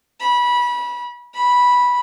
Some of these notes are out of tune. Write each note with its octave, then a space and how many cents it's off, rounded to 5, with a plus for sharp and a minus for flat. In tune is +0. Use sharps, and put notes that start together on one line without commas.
B5 -25
B5 -10